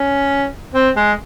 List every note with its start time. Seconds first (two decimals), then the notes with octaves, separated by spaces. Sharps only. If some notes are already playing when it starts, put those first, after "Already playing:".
Already playing: C#4
0.74 C4
0.96 G#3